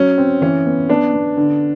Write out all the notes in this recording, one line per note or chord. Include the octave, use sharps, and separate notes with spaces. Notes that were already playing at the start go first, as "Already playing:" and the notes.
Already playing: F#3 C#4
C4
E3 C#4
B3
B3 D4
B3
D3